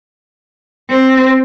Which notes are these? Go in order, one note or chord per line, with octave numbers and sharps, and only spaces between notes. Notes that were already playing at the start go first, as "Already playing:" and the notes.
C4